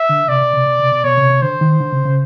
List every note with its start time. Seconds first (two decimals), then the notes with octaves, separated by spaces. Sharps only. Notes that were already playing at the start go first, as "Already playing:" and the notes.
Already playing: E5
0.09 D3
0.28 C3 D5
0.41 B2
0.54 C3
0.67 B2
0.79 C3
0.92 B2
1.04 B2 C#5
1.17 C3
1.30 C3
1.42 D3 C5
1.61 D#3
1.80 D3
1.92 C#3
2.05 C#3